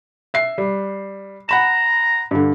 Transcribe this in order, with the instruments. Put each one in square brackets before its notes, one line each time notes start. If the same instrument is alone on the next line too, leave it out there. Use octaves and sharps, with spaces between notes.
[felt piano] E5 C7
G3
[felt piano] F#5 B5 E7 [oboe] A#5
[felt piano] G2 D3